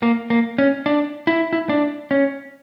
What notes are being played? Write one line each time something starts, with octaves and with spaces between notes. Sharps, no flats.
A#3
A#3
C#4
D4
E4
E4
D4
C#4